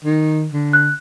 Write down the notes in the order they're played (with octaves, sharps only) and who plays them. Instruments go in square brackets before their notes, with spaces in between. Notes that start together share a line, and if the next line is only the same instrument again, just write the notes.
[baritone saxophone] D#3
D3
[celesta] F#6